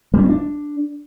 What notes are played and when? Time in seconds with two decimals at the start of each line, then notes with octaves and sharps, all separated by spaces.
0.14 G3
0.19 C#4
0.24 C4
0.29 D4